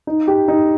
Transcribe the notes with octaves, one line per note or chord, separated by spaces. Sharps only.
D#4
G4
D#4